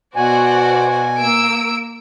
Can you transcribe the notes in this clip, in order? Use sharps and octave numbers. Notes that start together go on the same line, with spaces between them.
B2 F#4 C5 D5 G#5
A#3 E6 D7